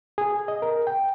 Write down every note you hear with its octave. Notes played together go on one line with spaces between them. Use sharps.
G#4
D#5
A#4
G5